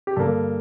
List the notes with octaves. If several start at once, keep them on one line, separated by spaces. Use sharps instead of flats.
G4
G2 D3 G3 A#3 A4